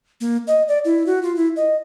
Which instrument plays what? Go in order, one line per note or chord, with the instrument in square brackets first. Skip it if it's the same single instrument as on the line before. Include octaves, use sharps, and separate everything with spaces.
[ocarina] A#3
D#5
D5
E4
F#4
F4
E4
D#5